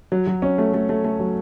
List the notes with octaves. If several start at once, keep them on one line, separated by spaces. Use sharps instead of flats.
F#3
F#3
C#4
A3
A3
A3
A3
F#3